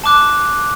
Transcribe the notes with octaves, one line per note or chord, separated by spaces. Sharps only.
A5 D6 F#6